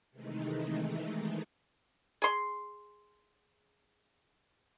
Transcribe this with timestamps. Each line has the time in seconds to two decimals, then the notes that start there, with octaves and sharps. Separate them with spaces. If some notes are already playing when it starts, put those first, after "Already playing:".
0.11 C3 D#3 E3 G#3 A3 D#4
2.22 G#4 C6